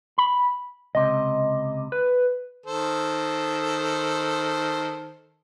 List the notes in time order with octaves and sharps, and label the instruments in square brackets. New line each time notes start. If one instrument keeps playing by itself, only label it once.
[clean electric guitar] B5
[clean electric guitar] C#2 C3 [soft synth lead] D#5
[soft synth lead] B4
[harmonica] D#3 A4 C5